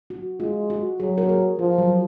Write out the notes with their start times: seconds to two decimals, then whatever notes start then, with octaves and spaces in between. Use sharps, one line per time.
0.10 F#4
0.40 G#3 F4
0.70 F#4
1.00 F#3 G#4
1.18 A#4
1.29 G#4
1.59 F3 F4
1.78 F#3